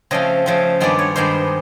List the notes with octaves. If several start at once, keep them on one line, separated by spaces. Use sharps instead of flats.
C#3 F3 A3 C4 D#5
C#3 F3 A3 C4
G2 D#3 G#3 B3 D5
C#5
G2 D#3 G#3 B3 C5